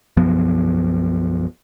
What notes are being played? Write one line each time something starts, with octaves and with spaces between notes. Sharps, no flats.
B1 F#2 F3 B3